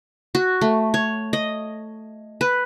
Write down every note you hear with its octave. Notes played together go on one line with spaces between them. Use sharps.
F#4
A3
C#5
D#5
B4